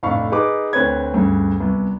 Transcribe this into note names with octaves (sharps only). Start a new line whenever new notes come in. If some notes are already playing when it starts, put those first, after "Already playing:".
F1 A2 D4 F5 B5 C#6
D#4 G#4 B4 D6
D2 C4 B4 C#5 G#6
D2 G2 C#3
C2 B3